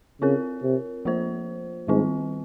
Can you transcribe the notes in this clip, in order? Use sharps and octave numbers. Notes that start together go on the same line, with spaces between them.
C#3 C4 F4 A#4 C#5
C3
F3 A#3 F4 C5
G#2 D#3 G3 C4 F4